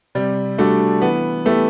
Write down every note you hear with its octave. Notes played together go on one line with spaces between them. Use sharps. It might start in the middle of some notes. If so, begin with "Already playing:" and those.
C3 G3
G3 A3 D4 F#4
E3 B3
A3 B3 E4 G4